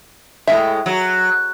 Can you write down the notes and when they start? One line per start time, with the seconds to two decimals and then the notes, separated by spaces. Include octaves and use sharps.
0.47 A2 C3 G#3 E5
0.86 F#3